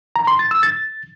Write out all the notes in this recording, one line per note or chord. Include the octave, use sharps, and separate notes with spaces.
A#5
C6
A6
E6
A6